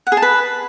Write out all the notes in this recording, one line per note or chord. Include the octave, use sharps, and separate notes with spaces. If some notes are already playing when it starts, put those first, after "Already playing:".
F#5
G#4
A5
B4